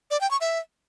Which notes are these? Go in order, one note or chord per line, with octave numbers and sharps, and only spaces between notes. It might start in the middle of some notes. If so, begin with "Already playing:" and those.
D5
G5
C#6
E5